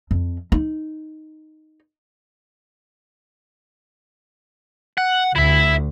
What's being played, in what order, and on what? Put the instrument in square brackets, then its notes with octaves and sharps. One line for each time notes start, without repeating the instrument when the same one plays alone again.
[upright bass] F2
D#4
[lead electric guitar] F#5
[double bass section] D2 [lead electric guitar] E4 E5